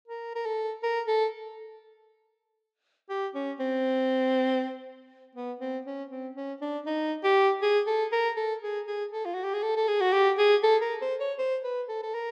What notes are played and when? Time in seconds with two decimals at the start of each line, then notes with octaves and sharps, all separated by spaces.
0.08 A#4
0.35 A#4
0.46 A4
0.83 A#4
1.08 A4
3.09 G4
3.34 C#4
3.60 C4
5.35 B3
5.61 C4
5.86 C#4
6.11 C4
6.36 C#4
6.61 D4
6.86 D#4
7.24 G4
7.62 G#4
7.87 A4
8.12 A#4
8.37 A4
8.62 G#4
8.87 G#4
9.12 A4
9.25 F4
9.34 F#4
9.44 G4
9.54 G#4
9.63 A4
9.76 A4
9.88 G#4
10.01 F#4
10.13 G4
10.38 G#4
10.63 A4
10.82 A#4
11.01 C5
11.20 C#5
11.38 C5
11.64 B4
11.89 A4
12.03 A4
12.14 A#4